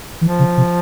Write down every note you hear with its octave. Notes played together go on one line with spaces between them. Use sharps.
E3 F3
C#3
C3